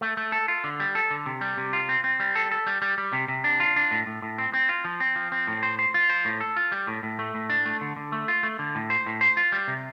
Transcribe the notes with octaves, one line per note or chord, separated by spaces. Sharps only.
A3
A3
A4
F4
D3
G3
A4
D3
C3
G3
C3
F4
C4
C4
G3
A4
A4
G3
G3
G3
C3
C3
D4
F4
D4
A2
A2
A2
C4
C4
F4
F3
C4
F3
C4
A2
C5
C5
F4
C5
A2
A4
F4
G3
A2
A2
A3
A2
D4
A3
D3
D3
A3
F4
A3
D3
A2
C5
A2
C5
F4
G3
C3